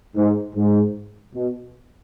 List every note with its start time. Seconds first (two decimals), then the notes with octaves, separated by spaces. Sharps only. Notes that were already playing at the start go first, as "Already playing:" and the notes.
0.16 G#2
0.56 G#2
1.34 B2